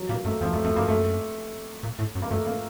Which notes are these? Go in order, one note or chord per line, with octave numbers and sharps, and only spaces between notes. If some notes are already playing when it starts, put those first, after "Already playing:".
Already playing: F#3
A#2 A#3
F#2 A3
F2 F3
F2 A3
F2 A3
F#2 A#3
F#2 A3
A#2
A2
F#2
A#3
F#2 A3
A#3